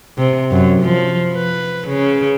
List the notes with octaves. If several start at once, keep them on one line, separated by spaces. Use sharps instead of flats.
C3
F#2
F3
B4
C#3